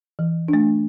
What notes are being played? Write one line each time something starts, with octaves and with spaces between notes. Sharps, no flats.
E3
D4
A3